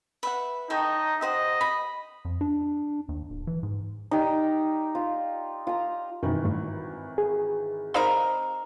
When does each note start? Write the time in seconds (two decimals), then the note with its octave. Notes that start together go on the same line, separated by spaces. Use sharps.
0.23 B4 E5 F#5
0.70 D#4 A4 C#5 G5
1.21 G4 C5 D#5 F#5
1.61 B5
2.25 F2
2.41 D4
3.09 D#2
3.30 D1
3.47 E3
3.63 G#2
4.11 D#4 G4 D5
4.95 F4
5.67 F4 A#5
6.23 G#1 F#2 B2 D#3 E3
6.44 D2 G2
7.18 G#4
7.94 C4 D#4 A#4 D5 F5 B5